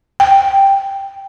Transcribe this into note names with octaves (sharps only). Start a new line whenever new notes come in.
G5